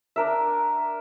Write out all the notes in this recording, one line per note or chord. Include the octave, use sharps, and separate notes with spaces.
D4 A#4 E5